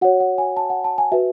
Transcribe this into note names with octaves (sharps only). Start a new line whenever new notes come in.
F#4 C#5 F#5
F#5
G#5
A5
F#5
A5
G#5
F#4 B4 E5